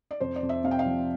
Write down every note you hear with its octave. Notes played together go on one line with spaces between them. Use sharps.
D5
F2 C5
D5
F2
E5
C3 F5
G5
F5
F3